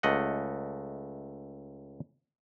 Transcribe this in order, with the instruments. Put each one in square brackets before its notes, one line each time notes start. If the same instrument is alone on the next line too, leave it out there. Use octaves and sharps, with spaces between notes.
[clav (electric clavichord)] C#2 A3 D#5 F#5